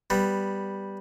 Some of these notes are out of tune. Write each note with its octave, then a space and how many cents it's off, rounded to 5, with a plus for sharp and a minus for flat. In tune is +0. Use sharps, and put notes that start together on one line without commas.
G3 +0 B3 +0